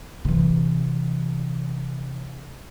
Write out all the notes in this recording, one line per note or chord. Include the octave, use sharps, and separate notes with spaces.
C3 E3